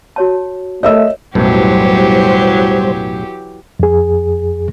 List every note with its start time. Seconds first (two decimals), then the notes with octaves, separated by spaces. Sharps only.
0.16 F#4 C#5 A5
0.83 A3 A#4 C#5 D#5 E5 E6
1.35 B1 F#2 A2 E3 F#3 G3 G4 C5
3.80 F2 G#4